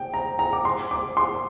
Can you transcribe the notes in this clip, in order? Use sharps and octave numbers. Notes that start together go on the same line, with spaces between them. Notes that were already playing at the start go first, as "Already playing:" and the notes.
Already playing: G5
A#5
A#5
D6
C6
D6
C6